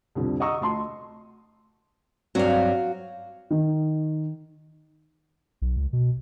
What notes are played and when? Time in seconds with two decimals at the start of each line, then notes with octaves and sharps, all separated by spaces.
0.15 C2 F2 D3
0.40 D#5 F#5 A#5 C#6 D#6 E6
0.61 D2 A5 C6
2.35 G2 F#3 C4 F#4 F5
3.51 D#3
5.62 B1
5.76 C#2
5.93 B2